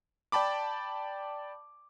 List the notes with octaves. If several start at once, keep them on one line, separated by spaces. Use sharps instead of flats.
D5 G5 A5 B5 D6